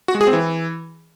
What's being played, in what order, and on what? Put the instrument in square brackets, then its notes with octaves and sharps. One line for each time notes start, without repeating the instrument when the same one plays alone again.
[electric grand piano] F#4
G#3
G#4
C4
E3